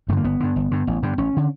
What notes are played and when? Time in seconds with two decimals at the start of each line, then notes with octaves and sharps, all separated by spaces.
0.08 G2 D3 A3
0.17 A#3
0.24 G1 B3
0.40 G2 D3
0.56 G1
0.71 G2 D3
0.87 A1
1.03 G2 D3
1.18 A1 C#4
1.37 D3